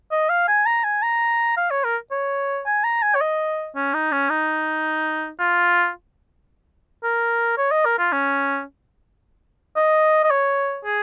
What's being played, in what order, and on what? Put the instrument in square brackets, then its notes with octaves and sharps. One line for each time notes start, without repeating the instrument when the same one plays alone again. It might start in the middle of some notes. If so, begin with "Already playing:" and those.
[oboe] D#5
F5
G#5
A#5
G#5
A#5
F5
C#5
A#4
C#5
G#5
A#5
G#5
C#5
D#5
C#4
D#4
C#4
D#4
F4
A#4
C#5
D#5
A#4
F4
C#4
D#5
D#5
C#5
G#4